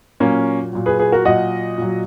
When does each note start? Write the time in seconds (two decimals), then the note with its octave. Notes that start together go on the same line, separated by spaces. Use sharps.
0.20 A#2 F#3 A#3 C#4
0.73 A#2 F#3
0.86 G#4 B4
0.99 G#4 B4
1.12 F#4 A#4
1.25 A#2 F#3 D#5 F#5
1.78 A#2 F#3